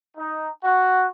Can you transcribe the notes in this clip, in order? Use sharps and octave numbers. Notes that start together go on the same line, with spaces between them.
D#4
F#4